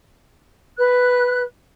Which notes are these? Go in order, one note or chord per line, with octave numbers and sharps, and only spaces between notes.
B4 F#6